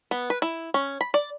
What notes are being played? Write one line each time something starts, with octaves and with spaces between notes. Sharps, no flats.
B3
B4
E4
C#4
B5
D5